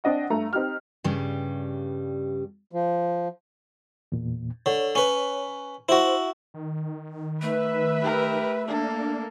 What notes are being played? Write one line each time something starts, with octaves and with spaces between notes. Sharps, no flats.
C4 D4 D#5 F#5
G2 A3 A#5
C4 D#4 G4 F6
G2 C#3 G3
F3
E2 A#2
D3 C#5
C#4 B4
E4 F#4 C5
D#3
A3 B4 E5
G4 A#4
A#3 D4 A4